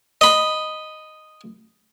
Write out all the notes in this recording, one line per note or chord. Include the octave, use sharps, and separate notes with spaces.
D#5 B5